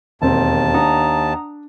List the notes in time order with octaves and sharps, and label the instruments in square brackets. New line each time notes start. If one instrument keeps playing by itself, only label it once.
[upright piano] E1 C4 [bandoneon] D#2 A5
[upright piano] D4 [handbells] F#5 A#5 D#6